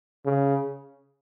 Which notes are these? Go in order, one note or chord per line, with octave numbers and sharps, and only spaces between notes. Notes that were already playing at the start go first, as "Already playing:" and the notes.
C#3